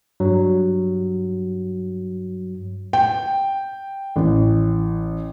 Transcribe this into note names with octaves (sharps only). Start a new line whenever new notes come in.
G2 F#3
G5
A1